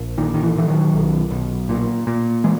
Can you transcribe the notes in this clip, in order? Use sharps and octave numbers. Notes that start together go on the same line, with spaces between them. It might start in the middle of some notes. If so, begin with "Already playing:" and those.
Already playing: A#1
A#2 D#3
D#3
E3
A#2 E3
D#3 F#3
B1
B1
A#2
A#2
E3 G#3